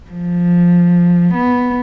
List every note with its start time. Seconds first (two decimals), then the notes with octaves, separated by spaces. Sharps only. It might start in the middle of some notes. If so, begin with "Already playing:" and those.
0.11 F3
1.34 B3